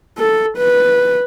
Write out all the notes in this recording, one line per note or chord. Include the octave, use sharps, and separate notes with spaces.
A4
B4